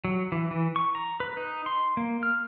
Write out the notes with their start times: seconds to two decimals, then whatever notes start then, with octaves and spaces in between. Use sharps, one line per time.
0.05 F#3
0.32 E3
0.51 E3
0.76 C#6
0.95 A#5
1.20 B4
1.37 D#4
1.66 C6
1.97 A#3
2.23 F6